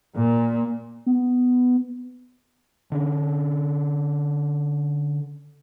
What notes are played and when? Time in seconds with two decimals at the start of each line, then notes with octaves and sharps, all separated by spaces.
0.14 A#2
1.06 B3
2.92 D3 C#4 D4